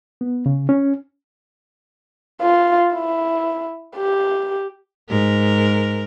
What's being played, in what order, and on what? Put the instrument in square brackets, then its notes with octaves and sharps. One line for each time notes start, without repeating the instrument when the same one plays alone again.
[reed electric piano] B3
C#3
C#4
[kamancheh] F4
E4
G4
[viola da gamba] G#2 A#4